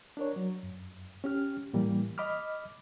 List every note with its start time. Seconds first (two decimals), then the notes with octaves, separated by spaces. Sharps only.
0.17 D4 A#4 C#5
0.36 F#3
0.63 F#2
1.24 C#4 G4 F6
1.73 A2 E3 G3 A#3
2.18 D#5 B5 D6 F6